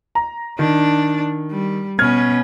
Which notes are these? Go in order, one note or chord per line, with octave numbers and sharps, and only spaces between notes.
A#5
D#3 D4
G3
B2 C#4 F6 G#6